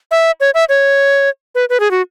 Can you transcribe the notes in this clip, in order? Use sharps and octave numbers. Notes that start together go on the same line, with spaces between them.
E5
C#5
E5
C#5
B4
B4
G#4
F#4